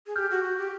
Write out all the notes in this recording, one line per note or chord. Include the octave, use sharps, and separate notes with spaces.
G#4
G4 F6 G6
F#4
F#4
G4